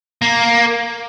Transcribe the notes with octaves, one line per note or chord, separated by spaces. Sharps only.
A#3